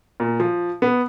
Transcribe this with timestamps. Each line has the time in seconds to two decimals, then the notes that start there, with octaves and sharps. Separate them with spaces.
0.20 A#2
0.40 F3
0.82 B3